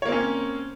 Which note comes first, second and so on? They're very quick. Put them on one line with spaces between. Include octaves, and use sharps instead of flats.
C#5 A#3 C4 C#4